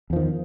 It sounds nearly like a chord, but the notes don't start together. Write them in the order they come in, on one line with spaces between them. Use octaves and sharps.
E2 F3 D#3